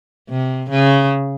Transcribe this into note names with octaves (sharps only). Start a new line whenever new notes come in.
C3
C#3